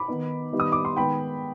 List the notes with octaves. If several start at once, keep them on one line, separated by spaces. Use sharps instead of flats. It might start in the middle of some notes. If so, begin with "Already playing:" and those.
Already playing: B5 D6
D#3 B3 D#4
D#3 G3 B3 D#4
D#6
D6
C6
D#3 G#3 B3 G5 B5